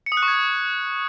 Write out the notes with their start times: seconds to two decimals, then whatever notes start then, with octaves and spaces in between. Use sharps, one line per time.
0.06 C#7
0.12 D#6
0.17 F#6
0.23 C#6
0.28 G#6